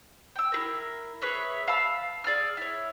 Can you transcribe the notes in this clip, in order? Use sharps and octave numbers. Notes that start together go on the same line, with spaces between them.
G5 E6
E4 G#4 A#4
G#4 B4 C#5 E5
F5 A5 B5 E6
G#4 D5 E6 F6
E4 C#5